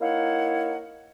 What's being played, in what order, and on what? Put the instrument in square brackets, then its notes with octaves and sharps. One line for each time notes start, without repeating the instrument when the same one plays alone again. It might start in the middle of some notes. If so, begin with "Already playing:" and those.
[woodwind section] A#3 D#4 E4 C#5 F5 F#5